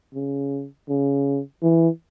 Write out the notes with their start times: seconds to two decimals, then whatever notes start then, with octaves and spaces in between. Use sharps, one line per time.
0.15 C#3
0.89 C#3
1.63 E3